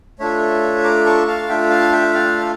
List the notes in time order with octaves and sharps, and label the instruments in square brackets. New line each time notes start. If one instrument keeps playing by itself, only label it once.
[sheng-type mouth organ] A3 D4 F4 A4 C#5 E5
A#5 D6
A5 C#6
F5 A5
A3 D4 F4 A4 E5 G5
F5 A5
E5 G5
D5 F5